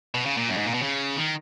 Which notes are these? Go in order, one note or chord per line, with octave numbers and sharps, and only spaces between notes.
B2
C#3
A#2
F#2
G#2
A#2
B2
C#3
D#3